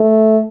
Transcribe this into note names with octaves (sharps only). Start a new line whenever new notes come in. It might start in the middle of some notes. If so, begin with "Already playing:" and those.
Already playing: A3